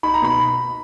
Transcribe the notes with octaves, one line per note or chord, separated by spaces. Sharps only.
D#4 B5
A#5
B2 B5